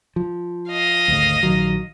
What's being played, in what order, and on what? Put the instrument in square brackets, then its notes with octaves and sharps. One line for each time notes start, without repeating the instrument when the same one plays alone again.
[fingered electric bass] F3
[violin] D#5 F5
[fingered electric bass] G#1 D2
A#1 D#3 F#3